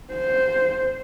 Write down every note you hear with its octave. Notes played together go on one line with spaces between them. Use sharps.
C5